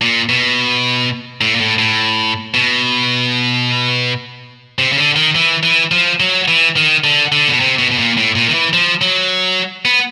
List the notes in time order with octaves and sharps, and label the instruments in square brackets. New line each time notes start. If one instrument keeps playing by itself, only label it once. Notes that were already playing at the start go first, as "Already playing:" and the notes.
[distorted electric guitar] A#2
B2
A2
A#2
A2
A2
B2
C3
C#3
D3
D#3
E3
E3
F3
F#3
E3
D#3
D3
D3
B2
C3
B2
B2
A#2
A2
A#2
D#3
E3
F3
F#3
B3